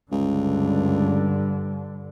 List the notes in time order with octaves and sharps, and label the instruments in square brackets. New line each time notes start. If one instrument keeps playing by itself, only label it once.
[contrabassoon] C#2 [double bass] G2 D3